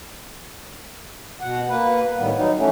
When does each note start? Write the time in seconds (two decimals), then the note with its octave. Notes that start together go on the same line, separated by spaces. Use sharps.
1.41 B2 F#5
1.69 A#3 B4
2.17 A2 D#3 G3 B3
2.36 F#3 D#4
2.57 E3 A3 C#4